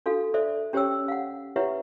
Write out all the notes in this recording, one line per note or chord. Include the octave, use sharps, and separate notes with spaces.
D4 F#4 A4 F5
A4 C5 D5 E5
C#4 G4 C5 C#5 G5 E6
F5 F#5
E4 G4 B4 C#5 E5 F#5